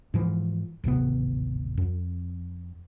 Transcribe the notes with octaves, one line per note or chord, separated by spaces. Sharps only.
G#2 E3 F3
D1 G#1 C3 B3
F2